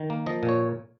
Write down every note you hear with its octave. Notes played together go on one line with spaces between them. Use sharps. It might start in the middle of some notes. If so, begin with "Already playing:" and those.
Already playing: D#3
A#3
F3 D#5
A#2
C#5